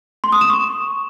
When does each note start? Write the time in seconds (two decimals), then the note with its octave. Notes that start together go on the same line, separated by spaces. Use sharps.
0.24 C6
0.32 D#6
0.41 E7
0.50 C#6